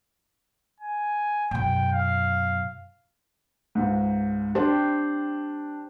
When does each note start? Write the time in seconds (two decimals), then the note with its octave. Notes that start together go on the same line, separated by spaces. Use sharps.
0.80 G#5
1.51 F#2 B2 G5
1.93 F5
3.75 C#2 G#2
4.55 D4 G4 C5